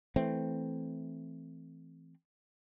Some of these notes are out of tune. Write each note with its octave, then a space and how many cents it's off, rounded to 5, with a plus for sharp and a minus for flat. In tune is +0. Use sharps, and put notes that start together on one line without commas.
E3 +0 A3 +0 C4 +0